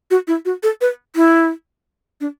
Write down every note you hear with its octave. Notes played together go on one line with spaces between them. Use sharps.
F#4
E4
F#4
A4
B4
E4
D4